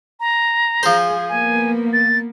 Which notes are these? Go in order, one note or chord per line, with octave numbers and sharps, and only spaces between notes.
A#5
F3 G#4 C5
A#3 B3 G#5
A6